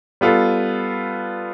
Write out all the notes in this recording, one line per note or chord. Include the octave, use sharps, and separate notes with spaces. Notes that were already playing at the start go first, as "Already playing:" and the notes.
G3 B3 F4 A4